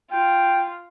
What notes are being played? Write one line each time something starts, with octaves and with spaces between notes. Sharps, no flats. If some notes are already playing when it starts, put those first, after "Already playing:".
F4 G5